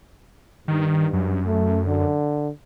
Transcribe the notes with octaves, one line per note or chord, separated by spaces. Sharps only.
G2 D#3
F#2
A3
D3